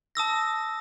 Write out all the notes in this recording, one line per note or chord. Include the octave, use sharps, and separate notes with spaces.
A5 D#6 E6 A#6